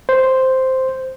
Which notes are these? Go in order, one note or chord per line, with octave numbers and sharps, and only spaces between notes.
C5